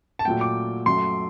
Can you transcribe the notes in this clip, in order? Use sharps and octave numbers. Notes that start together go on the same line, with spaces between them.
A5
A#2 F#3 A3 G5
D6
F#2 F#3 A3 C6